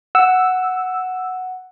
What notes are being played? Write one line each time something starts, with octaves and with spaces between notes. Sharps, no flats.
F#5 E6